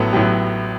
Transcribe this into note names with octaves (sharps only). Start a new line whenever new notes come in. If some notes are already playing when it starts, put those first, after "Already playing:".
Already playing: A1 A2 F#3 B3 A4
A1 A2 F#3 B3 G4